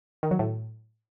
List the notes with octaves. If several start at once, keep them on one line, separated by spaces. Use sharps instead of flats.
D#3
F#3
A2